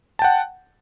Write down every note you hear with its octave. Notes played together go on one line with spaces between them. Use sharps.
F#5 G5 A5